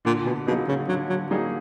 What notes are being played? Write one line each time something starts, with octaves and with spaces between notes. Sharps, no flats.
A#2 D3
B2
B2 F#3 A#3 D#4 G#4
C#3
D3 F#3
F#3
F#3 G3 A#3 D#4 G#4